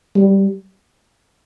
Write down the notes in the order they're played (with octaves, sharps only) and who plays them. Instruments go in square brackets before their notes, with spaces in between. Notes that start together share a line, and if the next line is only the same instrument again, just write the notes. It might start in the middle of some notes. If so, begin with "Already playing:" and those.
[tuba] G3